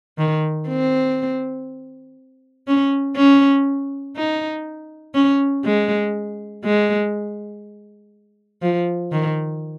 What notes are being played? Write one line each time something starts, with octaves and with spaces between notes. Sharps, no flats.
D#3
C4
C#4
C#4
D#4
C#4
G#3
G#3
F3
D#3